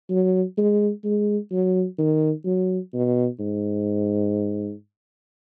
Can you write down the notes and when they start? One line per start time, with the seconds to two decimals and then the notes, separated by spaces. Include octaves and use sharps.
0.10 F#3
0.57 G#3
1.05 G#3
1.52 F#3
1.98 D#3
2.46 F#3
2.94 B2
3.40 G#2